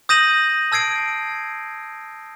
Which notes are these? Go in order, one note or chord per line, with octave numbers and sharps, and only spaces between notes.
D#6 G6 A#6 D#7 E7 F#7
A5 E6 G#6 C7 D7